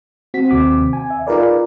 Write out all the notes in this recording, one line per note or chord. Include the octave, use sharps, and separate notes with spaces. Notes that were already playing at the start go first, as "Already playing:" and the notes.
C4 F#4 B6
D#2 C3 C4 D6
G#5
E5
D#4 F4 G#4 A#4 B4 D5